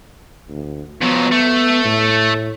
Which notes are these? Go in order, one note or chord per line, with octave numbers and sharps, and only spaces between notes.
D2
F2 F#3 B3
A3
A2